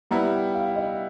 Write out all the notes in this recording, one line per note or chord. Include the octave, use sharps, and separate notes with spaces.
G3 B3 E4 A#5
G5
F5
D#5